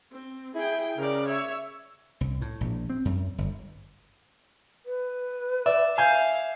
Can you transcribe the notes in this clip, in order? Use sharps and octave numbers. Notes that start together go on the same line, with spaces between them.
C4
E4 G#4 G5
C#3 A#4 D5
C#5 E5
C2
A2
A#1
C4
F#2
G1
B4
D5 E5
F5 G#5 G6